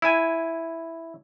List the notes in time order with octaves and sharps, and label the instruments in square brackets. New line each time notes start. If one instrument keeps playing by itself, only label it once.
[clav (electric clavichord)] E4 G#5